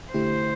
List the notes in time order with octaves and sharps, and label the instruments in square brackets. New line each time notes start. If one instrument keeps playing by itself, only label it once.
[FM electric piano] D3 A3 E4 G4 [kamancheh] C5